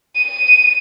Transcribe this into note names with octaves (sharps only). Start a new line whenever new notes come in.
D#7